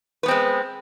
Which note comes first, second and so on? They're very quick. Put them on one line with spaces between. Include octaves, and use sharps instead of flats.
B4 B3 C4 G#3